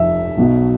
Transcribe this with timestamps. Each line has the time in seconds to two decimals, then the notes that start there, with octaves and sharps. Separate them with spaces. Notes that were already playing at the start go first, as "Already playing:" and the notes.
Already playing: F1 F2 E5
0.37 B1 B2 F#3